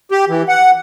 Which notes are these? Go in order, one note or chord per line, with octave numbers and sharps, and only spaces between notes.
G4
E3
F#5